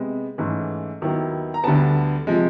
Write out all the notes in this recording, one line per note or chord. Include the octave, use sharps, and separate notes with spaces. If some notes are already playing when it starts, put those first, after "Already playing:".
Already playing: C3 G#3 B3
G#2 E3 A3 C#4
D#2 D#3 F#3 B3 E4
A#5
D2 D3 G3 B3 A5
C3 F3 G#3